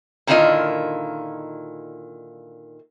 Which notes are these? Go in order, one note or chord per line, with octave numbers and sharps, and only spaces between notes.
A#2 D3 D#3 E4 F4 D#5